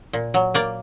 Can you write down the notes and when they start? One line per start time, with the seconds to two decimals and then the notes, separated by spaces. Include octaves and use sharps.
0.13 A#2
0.34 F#3
0.54 A#3 D5